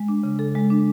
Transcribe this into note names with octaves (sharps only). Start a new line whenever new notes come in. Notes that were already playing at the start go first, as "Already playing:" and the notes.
Already playing: G#3
D4
C#3
A4
G#3
D4